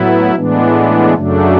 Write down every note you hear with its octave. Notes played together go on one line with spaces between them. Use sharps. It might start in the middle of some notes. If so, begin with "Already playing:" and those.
Already playing: A2 F#3 B3 E4
A2 E3 G#3 B3 D4
F#2 C#3 F#3 A3 D4